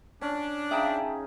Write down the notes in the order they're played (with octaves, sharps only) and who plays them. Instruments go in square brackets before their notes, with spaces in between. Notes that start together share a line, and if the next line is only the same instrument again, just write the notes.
[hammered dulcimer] C#4 [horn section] D4
[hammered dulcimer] C#3 D#4 G#4 [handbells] E5 G5 A5